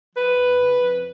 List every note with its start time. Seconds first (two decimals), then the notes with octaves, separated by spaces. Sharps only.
0.15 F3 B4
0.36 F2
0.58 C#3
0.79 F2